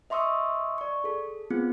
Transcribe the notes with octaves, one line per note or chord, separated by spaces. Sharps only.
D#5 E5 C6 C#6 D#6 E6
D5 C#6
G#4 A4
B3 C4 F4 G#4